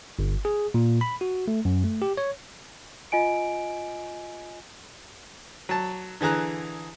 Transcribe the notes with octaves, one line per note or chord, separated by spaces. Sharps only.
G1
G#4
A#2
B5
F#4
A3
F#2
A3
G4
C#5
F4 D#5 G#5 D7
F#3 A5
D3 E3 G#4 A#5 F#6